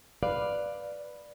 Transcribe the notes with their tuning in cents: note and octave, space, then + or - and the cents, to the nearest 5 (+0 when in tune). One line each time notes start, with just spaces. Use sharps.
B4 +0 D5 +5 F5 +0